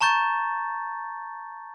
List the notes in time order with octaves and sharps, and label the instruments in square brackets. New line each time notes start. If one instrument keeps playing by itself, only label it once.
[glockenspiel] A5 A#5 C#6 G6 A6